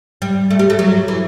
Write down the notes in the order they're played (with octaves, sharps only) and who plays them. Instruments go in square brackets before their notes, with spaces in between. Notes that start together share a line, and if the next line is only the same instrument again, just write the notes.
[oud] G3
A3
G3
A3
F#3
E3